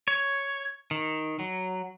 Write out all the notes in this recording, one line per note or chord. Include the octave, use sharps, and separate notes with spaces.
C#5
D#3
F#3